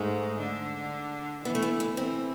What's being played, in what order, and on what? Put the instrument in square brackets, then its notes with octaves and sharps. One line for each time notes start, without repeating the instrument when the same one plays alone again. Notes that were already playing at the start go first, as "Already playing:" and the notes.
Already playing: [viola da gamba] G#2 G#3 [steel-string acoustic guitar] A3
[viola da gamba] D3 D4
[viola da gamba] E3 E4 [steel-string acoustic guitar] B3
[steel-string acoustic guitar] A3
B3
B3
[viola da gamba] E3 E4 [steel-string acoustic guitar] C4